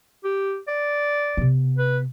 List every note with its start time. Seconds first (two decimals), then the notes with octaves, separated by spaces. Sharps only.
0.24 G4
0.68 D5
1.37 C3 B3
1.78 B4